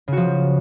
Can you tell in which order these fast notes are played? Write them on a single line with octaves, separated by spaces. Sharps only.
C#3 F#4 F3